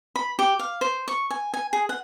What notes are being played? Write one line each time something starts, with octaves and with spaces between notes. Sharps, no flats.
B5
G4
F5
C5
C#6
G#5
G#5
G#4
F#5